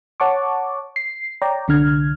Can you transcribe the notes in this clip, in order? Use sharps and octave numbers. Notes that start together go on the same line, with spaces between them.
C#5 F#5 A5 C#6 D6
C7
C#5 D5 G5 A#5
C2 D3 D4 F6 G#6